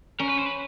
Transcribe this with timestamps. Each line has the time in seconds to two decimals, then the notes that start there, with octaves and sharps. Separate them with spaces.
0.19 C#4 A#4
0.28 B4
0.38 C5
0.46 B4